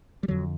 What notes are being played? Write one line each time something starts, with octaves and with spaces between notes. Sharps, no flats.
G3
F2 D3 F#3